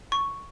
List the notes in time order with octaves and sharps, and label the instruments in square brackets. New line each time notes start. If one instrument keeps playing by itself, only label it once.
[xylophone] C#6